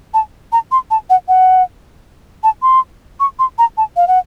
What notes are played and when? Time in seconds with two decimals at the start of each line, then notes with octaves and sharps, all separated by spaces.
0.14 A5
0.52 A#5
0.71 C6
0.90 A5
1.10 F#5
1.28 F#5
2.43 A5
2.62 C6
3.20 C#6
3.39 C6
3.58 A#5
3.77 A5
3.96 F5
4.08 F#5